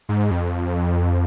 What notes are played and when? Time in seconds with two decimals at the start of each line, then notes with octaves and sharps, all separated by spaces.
0.09 G#2
0.31 F2